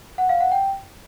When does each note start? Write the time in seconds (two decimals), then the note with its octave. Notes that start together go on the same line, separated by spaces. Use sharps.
0.18 F#5
0.29 F5
0.40 F#5
0.52 G5